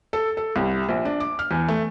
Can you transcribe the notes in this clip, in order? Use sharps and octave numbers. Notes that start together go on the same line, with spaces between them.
A4
A4
C2
A#1
D4
D6
F6
E2
A3